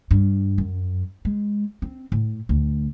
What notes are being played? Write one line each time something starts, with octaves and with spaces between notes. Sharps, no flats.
G2
F#2
G#3
C4
A2
D2